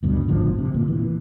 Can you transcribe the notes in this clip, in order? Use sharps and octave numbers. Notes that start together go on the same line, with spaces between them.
D2 G2 B2
G1 G#2 D3 F3
C3
A#2
E3